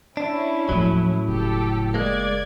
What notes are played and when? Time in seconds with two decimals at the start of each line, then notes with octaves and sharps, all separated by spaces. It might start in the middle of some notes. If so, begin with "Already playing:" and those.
0.17 C#4 D4 E4
0.69 D#2 A2 F3 F#3
1.28 F#1 G4 A4
1.94 G#3 A#3 D5 G#6